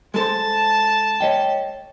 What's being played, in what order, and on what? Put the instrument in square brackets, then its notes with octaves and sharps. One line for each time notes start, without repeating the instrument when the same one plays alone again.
[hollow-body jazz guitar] G#3 A4 C5 [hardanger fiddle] A5
[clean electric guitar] C#5 D#5 G5